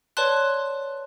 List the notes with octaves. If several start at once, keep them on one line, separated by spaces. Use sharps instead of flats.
B4 C#5 D5 A5 C6 F#6